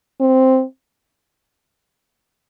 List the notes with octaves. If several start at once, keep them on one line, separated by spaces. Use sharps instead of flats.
C4